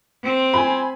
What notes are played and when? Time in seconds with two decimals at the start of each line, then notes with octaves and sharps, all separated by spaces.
0.23 C4
0.53 G#5 B5